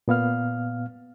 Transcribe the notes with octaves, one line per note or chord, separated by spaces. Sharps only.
A#2 B3 F5 F6